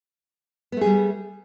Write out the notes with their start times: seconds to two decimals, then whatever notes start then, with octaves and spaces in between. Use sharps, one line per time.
0.72 B3
0.77 A3
0.81 G#4
0.86 G3